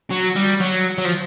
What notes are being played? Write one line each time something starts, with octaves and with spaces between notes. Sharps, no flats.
F#3
G3
F#3
F#3
F3